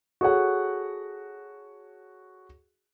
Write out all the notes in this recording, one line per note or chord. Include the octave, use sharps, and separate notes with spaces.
F#4 G#4 A4 C#5 F#5